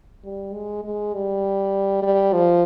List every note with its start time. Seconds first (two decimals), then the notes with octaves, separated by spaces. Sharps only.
0.25 G3
0.54 G#3
0.84 G#3
1.14 G3
2.02 G3
2.33 F3